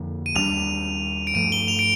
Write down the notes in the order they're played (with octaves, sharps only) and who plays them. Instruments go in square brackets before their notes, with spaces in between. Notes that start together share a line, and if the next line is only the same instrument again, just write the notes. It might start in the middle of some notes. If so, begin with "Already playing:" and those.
Already playing: [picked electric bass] F2 D3 F3 A#3
[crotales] D#7
[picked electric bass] D#2 D3 G3 D4 [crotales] F7
[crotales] D7
[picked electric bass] G2 F3 A3 [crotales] D#7
[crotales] G7
F7
D7